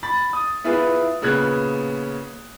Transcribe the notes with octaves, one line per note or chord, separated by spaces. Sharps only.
B5 A6
D#6
B3 E4 F4 G#4 B4
A#2 C#3 B3 F#6 G#6